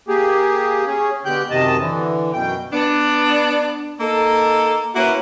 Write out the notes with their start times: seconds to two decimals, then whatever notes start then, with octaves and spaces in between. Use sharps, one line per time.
0.08 A#3 G4 G#4
0.86 C#4 G#4
1.25 B2 D3 G4 G5 F#6 G6
1.50 F#2 C3 D#3 D#5 A5
1.78 D3 E3
2.33 F#2 B2 G5
2.73 B3 D4
4.00 A#3 D#4 A4
4.95 A#3 C#4 E4 F#4 B4